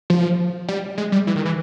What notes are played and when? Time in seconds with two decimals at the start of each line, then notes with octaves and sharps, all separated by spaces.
0.10 F3
0.69 G3
0.98 G#3
1.12 G3
1.27 E3
1.36 D#3
1.45 E3